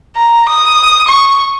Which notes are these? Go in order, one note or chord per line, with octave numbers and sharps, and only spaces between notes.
A#5
D#6
C#6